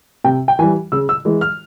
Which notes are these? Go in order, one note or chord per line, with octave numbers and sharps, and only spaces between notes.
C3 G5
G5
E3 G3 G#5
C#3 E6
E6
E3 G#3
F6